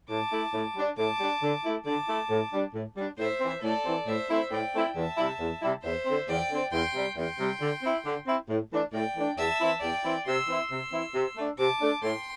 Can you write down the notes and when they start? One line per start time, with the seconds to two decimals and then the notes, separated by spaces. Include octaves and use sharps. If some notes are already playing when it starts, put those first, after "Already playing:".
0.09 A2 A5 D6
0.32 A3 E4
0.54 A2
0.76 G3 D4
0.98 A2 A5 D6
1.20 G3 D4
1.43 D3
1.65 A3 E4
1.86 D3 A5 D6
2.09 A3 E4
2.30 A2
2.53 G3 D4
2.75 A2
2.97 G3 D4
3.19 A2 C5 E5
3.41 E3 C4
3.63 A2 A4 D5
3.85 E3 C4
4.07 A2 C5 E5
4.30 A3 C4 E4
4.52 A2 D5 G5
4.74 A3 C4 E4
4.96 E2 E5 A5
5.17 C3 G3 E4
5.40 E2
5.62 C3 G3 E4
5.84 E2 C5 E5
6.06 D3 C4
6.29 E2 D5 G5
6.51 D3 C4
6.72 E2 G5 C6
6.95 C3 G3
7.17 E2 G5 C6
7.39 C3 G3
7.61 D3
7.83 C4 E4
8.06 D3
8.27 C4 E4
8.50 A2
8.72 E3 A3 D4
8.94 A2 D5 G5
9.16 E3 A3 D4
9.38 E2 E5 A5
9.61 E3 C4 E4
9.82 E2 D5 G5
10.04 E3 C4 E4
10.27 C3 C6 E6
10.48 E3 C4 E4
10.70 C3 C6 E6
10.93 E3 C4 E4
11.15 C3
11.37 A3 D4
11.59 C3 A5 D6
11.81 A3 D4
12.03 A2 G5 C6